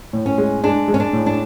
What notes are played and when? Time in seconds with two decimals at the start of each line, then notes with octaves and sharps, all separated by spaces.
0.13 A2
0.26 C#4
0.38 G#3
0.63 G#3 D4
0.88 G#3
0.94 C#4
1.00 D4
1.13 A2
1.26 D4